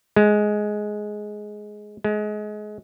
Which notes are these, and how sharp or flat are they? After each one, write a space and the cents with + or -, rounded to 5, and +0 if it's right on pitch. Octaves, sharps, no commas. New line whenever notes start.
G#3 +10
G#3 +25